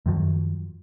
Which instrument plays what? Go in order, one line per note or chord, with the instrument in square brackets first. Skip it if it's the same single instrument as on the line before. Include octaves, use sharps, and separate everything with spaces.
[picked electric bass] F#2 D#3 F3 F#3